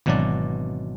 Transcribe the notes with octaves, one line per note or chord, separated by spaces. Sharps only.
G#1 B2 E3 F#3 D4 D5